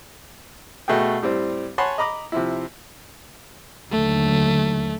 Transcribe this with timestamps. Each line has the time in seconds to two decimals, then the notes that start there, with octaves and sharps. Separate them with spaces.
0.88 B2 A3 F#4 G#4 G5
1.23 A2 G3 C4
1.78 C#5 F#5 G#5 A5 B5 C6
1.98 D#5 A#5 B5 D6 D#6
2.32 C3 F3 E4
3.92 D#2 D3 F#3 A3